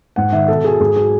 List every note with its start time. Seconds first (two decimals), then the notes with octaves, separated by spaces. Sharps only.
0.16 G#2 F#5
0.32 D#3 E5
0.48 B2 A4
0.64 F#3 G#4
0.80 G#2 G#4
0.96 F#3 G#4